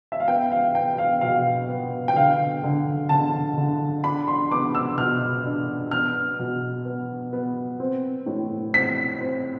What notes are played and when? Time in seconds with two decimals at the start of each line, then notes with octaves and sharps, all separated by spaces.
0.12 E5
0.20 F5
0.28 B3 G5
0.52 F5
0.75 B3 G5
0.98 F5
1.21 B2 F5
1.69 B3
2.08 G5
2.16 D3 F5
2.63 D3
3.09 D3 A5
3.57 D3
4.04 D4 B5
4.28 C6
4.51 B3 D6
4.75 E6
4.97 B2 F6
5.45 D4
5.91 B3 F6
6.39 B2
6.85 B3
7.33 B3
7.80 C4
8.26 A2
8.74 C4 B6
9.21 C4